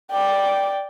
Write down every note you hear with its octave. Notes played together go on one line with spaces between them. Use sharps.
D5 G5